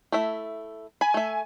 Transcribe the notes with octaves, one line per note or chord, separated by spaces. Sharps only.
A3 E4 E5
G#5 B5
A3 E5